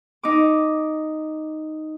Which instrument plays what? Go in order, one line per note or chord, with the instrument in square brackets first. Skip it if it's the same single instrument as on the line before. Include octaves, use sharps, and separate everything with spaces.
[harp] D#4 D6